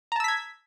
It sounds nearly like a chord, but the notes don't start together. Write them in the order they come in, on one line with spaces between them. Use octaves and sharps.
A#5 A5 E6 B6 G#6